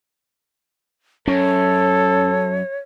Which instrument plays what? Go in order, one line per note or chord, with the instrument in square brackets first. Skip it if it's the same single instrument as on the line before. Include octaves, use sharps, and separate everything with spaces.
[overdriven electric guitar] F#2 [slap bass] C#4 [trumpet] A4 [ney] C#5